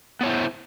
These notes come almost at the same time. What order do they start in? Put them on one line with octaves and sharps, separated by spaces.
B3 C#5 E4 C5